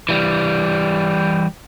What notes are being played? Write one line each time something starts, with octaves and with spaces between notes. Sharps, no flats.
E3 G3